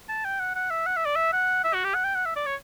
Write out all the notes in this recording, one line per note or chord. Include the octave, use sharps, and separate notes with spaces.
A5
G5
F#5
F#5
E5
F#5
E5
D5
E5
F#5
E5
F#4
G4
F#5
G5
F#5
E5
D5
C#5